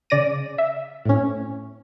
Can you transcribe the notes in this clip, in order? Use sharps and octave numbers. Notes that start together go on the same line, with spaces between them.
C#3 D5 A#6 D#7
E5
A2 C#4